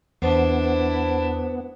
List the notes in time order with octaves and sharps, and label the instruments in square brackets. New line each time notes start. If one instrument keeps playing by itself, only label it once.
[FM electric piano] E2 [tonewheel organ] B3 [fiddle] D4 E4 [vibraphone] C5